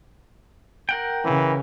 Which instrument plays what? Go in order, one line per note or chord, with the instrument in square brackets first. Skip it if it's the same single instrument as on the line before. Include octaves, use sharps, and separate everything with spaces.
[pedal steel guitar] A#4 F#5 G5
[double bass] C#3 [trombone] E3